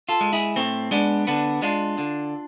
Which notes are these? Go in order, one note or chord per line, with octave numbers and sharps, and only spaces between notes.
F4 A4
G#3
E4 G#4
A2 A3 C4
G#3 B3 D4
D3 B3 D4
G#3 D4 F4
D3